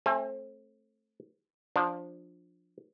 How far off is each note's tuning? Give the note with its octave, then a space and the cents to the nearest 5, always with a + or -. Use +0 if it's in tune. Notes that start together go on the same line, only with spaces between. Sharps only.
A3 +0 C4 +35 G#5 +0
F3 +15 D4 +0